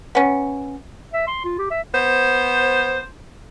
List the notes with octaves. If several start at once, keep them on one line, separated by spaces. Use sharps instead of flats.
B3 C#4
E5
C6
F4
G4
E5
B3 C5